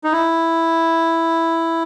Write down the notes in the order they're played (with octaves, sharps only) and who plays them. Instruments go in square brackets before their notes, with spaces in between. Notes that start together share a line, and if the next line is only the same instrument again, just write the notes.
[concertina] D#4
E4